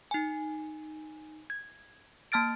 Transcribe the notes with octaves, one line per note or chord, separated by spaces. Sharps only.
D#4 G#5
G#6
A#3 A5 F6 A6 D7